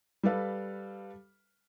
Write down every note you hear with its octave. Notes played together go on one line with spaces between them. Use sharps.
G3 A4 B4 F5